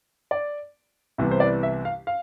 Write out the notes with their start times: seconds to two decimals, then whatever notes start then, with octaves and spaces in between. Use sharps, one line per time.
0.31 D5
1.18 C2 C3 E3 B3
1.31 C5
1.40 D5
1.63 E5
1.85 F5
2.07 F5